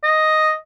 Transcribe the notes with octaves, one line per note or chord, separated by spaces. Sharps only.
D#5